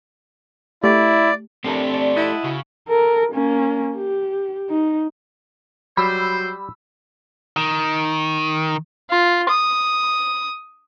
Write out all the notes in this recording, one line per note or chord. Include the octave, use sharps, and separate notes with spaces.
A3 E4 G4 D5
F3 A3 C4 D4 G4 A#4
A4 D5
E4 D#5 F#5 A5
C#3 F#4
A4 A#4
A#3 C#4
G4
D#4
F#3 G3 C5 B5 E6
D#3
F4
D#6